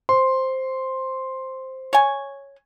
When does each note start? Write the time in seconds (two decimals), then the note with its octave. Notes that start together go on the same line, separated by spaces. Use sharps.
0.09 C5 C6
1.93 C#5 G#5